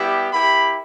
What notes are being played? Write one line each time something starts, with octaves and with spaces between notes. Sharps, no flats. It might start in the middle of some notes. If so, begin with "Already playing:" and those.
Already playing: G3 B3 E4 G4
A#3 E4 G4 B5